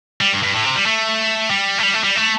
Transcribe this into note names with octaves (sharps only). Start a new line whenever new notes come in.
G3
G2
G2
A2
C3
G3
A3
G3
A3
G3
A3
G3
A3